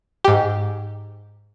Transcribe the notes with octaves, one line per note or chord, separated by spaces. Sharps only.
G#2 G4